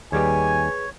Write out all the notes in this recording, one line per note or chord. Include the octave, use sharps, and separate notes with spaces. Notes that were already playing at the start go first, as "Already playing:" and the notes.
D#2 G3 G4 G#4 B4 C#5 G#5